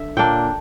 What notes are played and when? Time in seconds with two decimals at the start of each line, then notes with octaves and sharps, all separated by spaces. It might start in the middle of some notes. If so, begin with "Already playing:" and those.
Already playing: D3 E5
0.17 A#2 A#3 D4 G5